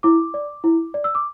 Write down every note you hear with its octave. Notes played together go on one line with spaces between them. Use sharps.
E4 D6
D5
E4
D5
E6
D6